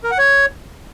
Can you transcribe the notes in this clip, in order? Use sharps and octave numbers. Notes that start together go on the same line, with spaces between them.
A#4
F#5
C#5